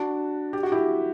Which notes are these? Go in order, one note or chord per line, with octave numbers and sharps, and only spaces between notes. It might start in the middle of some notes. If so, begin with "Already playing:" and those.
Already playing: D4 F#4
G4
F#4
E4 G4